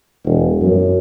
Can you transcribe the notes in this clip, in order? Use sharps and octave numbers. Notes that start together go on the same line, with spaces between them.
E1
F#2